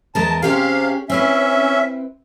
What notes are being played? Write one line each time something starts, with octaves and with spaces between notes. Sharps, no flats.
E2 G#3 A#4 A5
C3 C#4 G4 G#4 F5
C4 C#4 E4 B4 E5